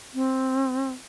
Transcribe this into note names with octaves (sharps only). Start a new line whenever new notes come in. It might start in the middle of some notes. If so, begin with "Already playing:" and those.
C4